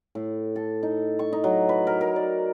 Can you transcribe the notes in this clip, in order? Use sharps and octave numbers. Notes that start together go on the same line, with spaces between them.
A2
A4
D#4
C#6
D#4
F#3
B4
A#4
A#4
D5